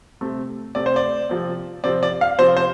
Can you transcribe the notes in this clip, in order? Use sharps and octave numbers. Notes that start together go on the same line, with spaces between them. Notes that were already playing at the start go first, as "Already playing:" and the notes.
C3 A3 C4
C3 A3 C4 D5
C5
D5
C3 F3 C4
C3 F3 C4 D5
D5
F5
C3 F3 C4 C5
C5